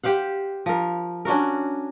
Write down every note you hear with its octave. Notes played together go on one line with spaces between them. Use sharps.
G4 C5 F5 F#5
F3 A#4
C#4 D4 F#4 A#4